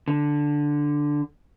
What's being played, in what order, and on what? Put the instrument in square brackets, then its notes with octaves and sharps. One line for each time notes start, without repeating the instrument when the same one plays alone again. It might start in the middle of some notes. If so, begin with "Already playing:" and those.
[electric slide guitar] D3